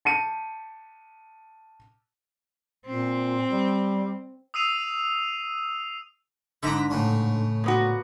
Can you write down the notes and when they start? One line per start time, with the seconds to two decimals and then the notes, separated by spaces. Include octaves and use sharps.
0.05 A5 C#7 D#7
2.86 A#2 C4
3.51 G3
4.54 D#6 E6 C7 D#7 F7
6.63 G#2 D3 E5 A#5 B5
6.90 A2 C#3
7.64 A#2 B3 F#4